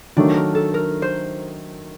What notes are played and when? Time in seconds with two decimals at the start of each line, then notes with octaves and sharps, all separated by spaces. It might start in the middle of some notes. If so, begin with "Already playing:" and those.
0.17 D#3 F#3 A3 D4
0.35 A#4
0.55 A4
0.74 A#4
1.02 C5